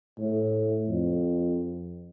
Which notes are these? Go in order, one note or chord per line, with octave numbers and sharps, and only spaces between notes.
A2
F2